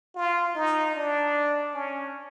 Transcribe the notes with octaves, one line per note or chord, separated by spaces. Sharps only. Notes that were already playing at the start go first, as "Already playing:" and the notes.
F4
D#4
D4
C#4